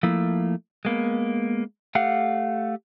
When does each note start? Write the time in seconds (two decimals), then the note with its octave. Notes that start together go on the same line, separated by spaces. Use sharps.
0.03 F3 A3 A#3 E4
0.85 G#3 A#3 B3
1.95 A3 G4 F5 F#5